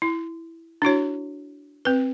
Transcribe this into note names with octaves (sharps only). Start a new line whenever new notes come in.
E4
D4 E4 F#4 C#5
C4 B4